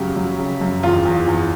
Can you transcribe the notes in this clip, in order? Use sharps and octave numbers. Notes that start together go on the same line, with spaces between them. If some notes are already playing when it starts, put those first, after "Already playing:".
Already playing: F#2 C#3 F#3 G4
F#3
C#3
F#2
E2 F4
E2
E2